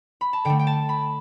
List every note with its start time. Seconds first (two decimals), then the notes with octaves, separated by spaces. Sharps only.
0.21 B5
0.33 A5
0.45 D3 A3 G5
0.59 G5
0.67 A5
0.89 B5